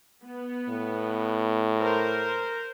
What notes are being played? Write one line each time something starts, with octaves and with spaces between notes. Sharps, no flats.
B3
A2
A#4 C5